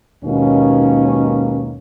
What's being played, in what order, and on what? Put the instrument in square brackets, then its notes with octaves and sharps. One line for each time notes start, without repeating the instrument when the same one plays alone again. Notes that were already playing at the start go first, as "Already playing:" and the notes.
[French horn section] D#2 G#2 B2 A#3 C#4